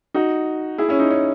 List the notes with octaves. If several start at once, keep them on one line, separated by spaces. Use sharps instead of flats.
D#4 F#4
E4 G#4
C#4 E4
D#4
C#4